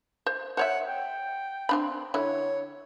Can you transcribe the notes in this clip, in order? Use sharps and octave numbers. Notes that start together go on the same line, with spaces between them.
C5
C5 C#5 E5 F#5
G5
C4 D4 B5
D3 E4 C#5